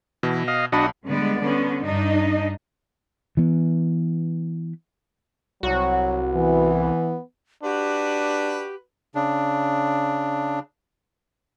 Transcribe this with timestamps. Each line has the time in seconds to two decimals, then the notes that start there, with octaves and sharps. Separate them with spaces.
0.23 B2 E3
0.48 D#5 F5
0.72 B1 D4 F#4 D#5 A5 B5
1.04 D3 G3 G#3 B3 D5
1.42 D3 B3 C#4
1.86 G2 D4 D#4 D#5
3.37 E3 B3
5.63 C2 F#3 F#4
6.34 E3 B3
7.64 D4 F#4 G4 B4
9.15 C#3 D4